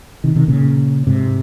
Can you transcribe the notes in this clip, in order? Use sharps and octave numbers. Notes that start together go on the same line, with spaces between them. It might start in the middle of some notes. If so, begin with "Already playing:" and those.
C3 D#3
C3 D#3
A#2 C#3
G#2 C3